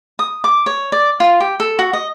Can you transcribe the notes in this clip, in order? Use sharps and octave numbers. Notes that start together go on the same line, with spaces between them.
D#6
D6
C#5
D5
F4
G4
A4
F#4
D#5